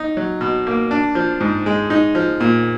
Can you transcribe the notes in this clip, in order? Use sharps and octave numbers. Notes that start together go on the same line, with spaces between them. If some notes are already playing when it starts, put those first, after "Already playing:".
Already playing: D#4
F#3
B2
A#3
D4
F3
G#2
G#3
D#4
F3
A#2